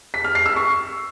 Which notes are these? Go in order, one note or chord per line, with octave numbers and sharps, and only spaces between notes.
B6
F6
C7
E6
C#6